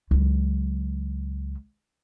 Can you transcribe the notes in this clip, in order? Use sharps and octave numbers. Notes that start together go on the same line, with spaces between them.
C#2 F#3